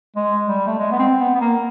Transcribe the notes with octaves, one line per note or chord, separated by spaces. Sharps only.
G#3
G3
A3
G#3
B3
C4
B3
B3
A#3